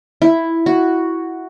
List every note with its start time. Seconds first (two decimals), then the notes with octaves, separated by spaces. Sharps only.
0.22 E4
0.66 F#4